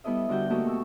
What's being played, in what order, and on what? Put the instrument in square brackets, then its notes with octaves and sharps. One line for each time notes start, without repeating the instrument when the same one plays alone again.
[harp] G3 B3 E4 A4 D#5 E5
D3 G3 F#4 G6
A3 A#3 F#4 G4 A4 D#5
B2 C#6 E6